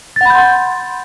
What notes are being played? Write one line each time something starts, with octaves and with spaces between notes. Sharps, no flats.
F#5 B5 C6 G6 A6